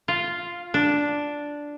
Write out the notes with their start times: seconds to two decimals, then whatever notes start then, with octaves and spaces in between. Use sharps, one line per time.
0.08 F4
0.74 D4